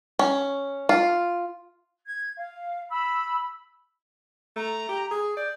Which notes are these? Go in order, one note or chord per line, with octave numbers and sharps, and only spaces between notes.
C#4
F4
G#6
F5
B5 E6
A3 A#5
G4
G#4
D5 G6